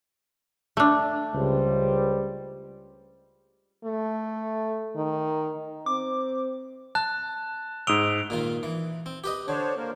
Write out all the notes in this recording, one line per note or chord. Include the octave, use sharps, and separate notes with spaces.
A3 D4
C#2 G3 C5
A3
D#3
C4 D6
A5 F#6
G#2 D#6 E6 D7 F7 G7
A#2 D#3 F4
E3
C4
G4 B4 D#5
D3 D4 C5 C#5
A#3 A#4 C5